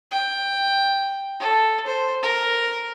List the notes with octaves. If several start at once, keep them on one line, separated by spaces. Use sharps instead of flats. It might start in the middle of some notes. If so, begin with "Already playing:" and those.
G5
A4
C5
A#4